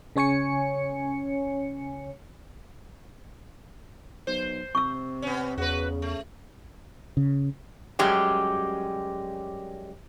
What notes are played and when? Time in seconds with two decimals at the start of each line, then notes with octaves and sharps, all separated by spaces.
0.16 C#3 C#4 C#5 G#5 C#7
4.27 B1 C5
4.75 C3 C#6 E6
5.22 B3 C#4
5.58 E2 C#3 F#4 B4
6.02 A3
7.17 C#3
7.99 F#2 G3 G#3 C#4 G4